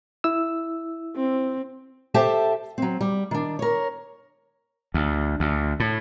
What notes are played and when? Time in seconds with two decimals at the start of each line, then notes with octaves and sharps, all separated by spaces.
0.24 E4 E6
1.16 C4
2.14 G4 A4 C5 E5 G5 A5
2.78 F#3 C4
3.01 G3
3.31 D#3 D4
3.59 A#4 C#5
4.94 D2
5.40 D2
5.80 A2